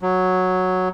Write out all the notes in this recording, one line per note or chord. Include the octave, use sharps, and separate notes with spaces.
F#3